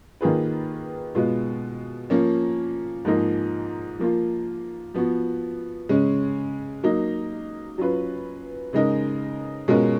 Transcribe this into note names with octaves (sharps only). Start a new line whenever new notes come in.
D#3 A#3 F4 G#4 B4
B2 G#3 B3 F4
F3 A#3 C#4
G#2 F3 A#3 D#4 A#4
F3 A#3 F4
F3 B3 F#4
C#3 G#3 C#4
F#3 A#3 D#4
F#3 C#4 F4 B4
C#3 G#3 D#4 A#4
B2 G#3 C#4 F4 A#4